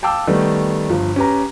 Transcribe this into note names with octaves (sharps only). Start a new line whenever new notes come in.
F5 G5 A5 D6 E6
D#3 G3 A3 B3
G1 F3
C#4 G4 B4 A#5